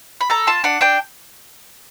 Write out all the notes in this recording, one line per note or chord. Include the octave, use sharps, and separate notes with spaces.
B5
A4 A#5
F4 A5
D4 F#5
D4 G5